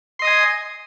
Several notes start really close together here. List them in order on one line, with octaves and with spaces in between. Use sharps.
C6 D#5 D#6 G#5